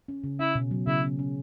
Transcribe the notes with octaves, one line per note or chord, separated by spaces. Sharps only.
C#4
C#3
C#4 E4
B2
F#3
C#3 E4
C#4
C#4